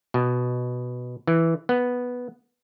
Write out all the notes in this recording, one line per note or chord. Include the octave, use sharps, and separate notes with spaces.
B2
E3
B3